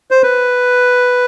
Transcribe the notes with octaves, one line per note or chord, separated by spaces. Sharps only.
C5
B4